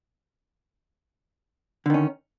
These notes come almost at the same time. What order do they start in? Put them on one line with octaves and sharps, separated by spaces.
D3 D#3 C#4